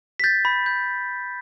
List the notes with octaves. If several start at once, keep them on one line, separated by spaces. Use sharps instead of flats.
B6
G6 A6
B5
G6